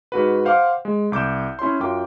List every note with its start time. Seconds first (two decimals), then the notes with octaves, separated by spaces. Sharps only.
0.12 G#2 F#4 B4
0.45 C5 F5 F#5 C6 D6
0.85 G#3
1.12 C2 D6 G6 E7
1.59 C#4 E4 C#5 C6
1.80 F#2 F4 G5 D6